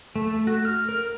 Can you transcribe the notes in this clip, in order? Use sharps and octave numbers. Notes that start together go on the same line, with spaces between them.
A3
F#4
F6
A#4